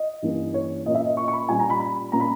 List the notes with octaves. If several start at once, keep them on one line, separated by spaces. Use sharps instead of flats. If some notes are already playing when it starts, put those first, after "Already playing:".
Already playing: D#5
G2 E3 G3 A#3 C#4
C#5
A#2 A#3 C#4 D#5
E5
D#5
C#6
C#6
B5
A#2 G3 C#4 G#5
A#5
B5
B5
A#2 A#3 C#4 A#5
B5